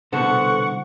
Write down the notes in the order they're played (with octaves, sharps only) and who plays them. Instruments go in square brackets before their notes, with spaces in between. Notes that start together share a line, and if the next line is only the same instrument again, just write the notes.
[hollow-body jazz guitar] C2 B2 D3 [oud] B3 A4 C5 [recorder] F#5 [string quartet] C#6